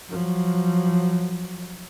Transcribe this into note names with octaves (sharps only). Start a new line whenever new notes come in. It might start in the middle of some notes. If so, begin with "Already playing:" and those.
F3 F#3